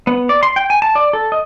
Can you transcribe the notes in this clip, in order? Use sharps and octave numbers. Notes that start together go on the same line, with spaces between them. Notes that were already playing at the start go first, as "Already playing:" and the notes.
B3
D5
C6
G5
G#5
A5
D5
A4
D#5